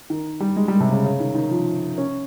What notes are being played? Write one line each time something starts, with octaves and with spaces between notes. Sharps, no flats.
D#3
G3
G#3
G3
C3
C#3
C#3
D#3
D#3
F3
C#4